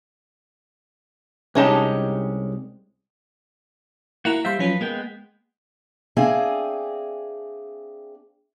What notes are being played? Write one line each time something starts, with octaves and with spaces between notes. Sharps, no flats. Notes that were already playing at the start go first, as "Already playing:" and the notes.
C2 G#3 C#4 D#4 G4 A5
A#3 E4 F#4 F#5 A#5
G3 C5 E5 F5 C6
F3 F#3 C#4 F4 B4
G#3 A#3 B3 G5
C4 D4 G#4 E5 F5 G#5